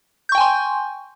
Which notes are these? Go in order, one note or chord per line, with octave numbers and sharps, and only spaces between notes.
G5 G#5 C6 C#6 G6